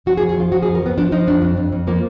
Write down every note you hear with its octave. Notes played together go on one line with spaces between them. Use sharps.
F3 F#4
G#4
F2
G#4
F3 F4
F3 F#4
G#4
F2
A#4
F3 B3
F3 D4
F3 D#4
F2 D4
F2
F2
F2
F3 A#3